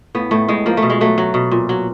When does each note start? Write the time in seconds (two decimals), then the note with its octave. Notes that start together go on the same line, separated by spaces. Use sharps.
0.15 A2 B3
0.31 A2 A3
0.48 A2 G#3
0.66 F3 A#3
0.77 A3
0.82 B2
0.90 G#3
1.01 F#3 A3
1.18 F#3
1.34 B2
1.51 A#2
1.69 F#3